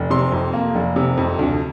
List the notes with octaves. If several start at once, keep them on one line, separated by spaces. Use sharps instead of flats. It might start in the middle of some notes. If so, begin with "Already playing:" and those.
Already playing: F1
C3 C6
F2
A#3
F1
C3
F2
D2